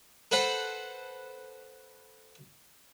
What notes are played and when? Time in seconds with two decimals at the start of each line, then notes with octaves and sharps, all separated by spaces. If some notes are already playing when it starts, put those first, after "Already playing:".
0.31 A4 B4 C5 F#5